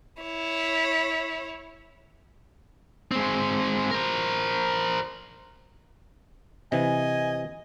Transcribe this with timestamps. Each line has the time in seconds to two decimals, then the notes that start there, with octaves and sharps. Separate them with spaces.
0.22 E4 C#5
3.11 G#3 C4
3.91 A#4 C5
6.72 C3 E3 D#5 G#5